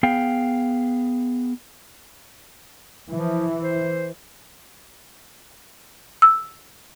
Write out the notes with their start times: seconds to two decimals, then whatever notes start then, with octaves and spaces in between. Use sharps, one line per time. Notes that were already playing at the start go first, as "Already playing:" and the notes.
0.03 B3 G#4 F5 G5
3.11 E3 F3
3.63 C5
6.22 E6